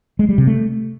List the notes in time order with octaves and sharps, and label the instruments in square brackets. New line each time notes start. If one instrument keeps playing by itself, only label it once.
[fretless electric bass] G#3
G3
C3
A3